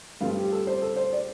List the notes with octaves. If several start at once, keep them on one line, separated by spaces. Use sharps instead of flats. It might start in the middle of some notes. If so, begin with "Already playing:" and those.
G2 F3 A3 F4
G4
A4
C5
A4
C5
D5